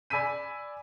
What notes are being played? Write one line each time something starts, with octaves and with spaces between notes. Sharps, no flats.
D5 G#5 B5 E6 B6 D#7